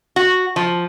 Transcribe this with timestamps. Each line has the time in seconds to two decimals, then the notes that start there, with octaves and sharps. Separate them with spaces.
0.16 F#4
0.56 F3